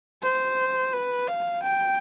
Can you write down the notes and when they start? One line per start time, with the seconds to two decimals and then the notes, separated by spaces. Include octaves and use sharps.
0.23 C5
0.93 B4
1.28 F5
1.63 G5